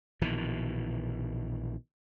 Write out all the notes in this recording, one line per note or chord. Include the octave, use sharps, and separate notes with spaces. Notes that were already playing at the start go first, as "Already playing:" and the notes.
A#1 B2 D#3 E3